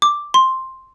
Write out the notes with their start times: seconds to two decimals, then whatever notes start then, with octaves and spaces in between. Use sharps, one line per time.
0.02 D6
0.34 C6